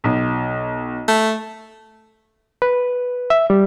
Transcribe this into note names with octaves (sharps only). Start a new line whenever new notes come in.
B1
A3
B4
E5
G3